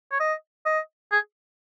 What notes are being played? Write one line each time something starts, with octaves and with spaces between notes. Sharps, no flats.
C#5
D#5
D#5
G#4